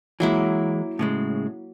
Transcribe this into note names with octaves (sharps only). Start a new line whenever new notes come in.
E3 F#3 G#3 A#3 E4
A2 C#3 G#3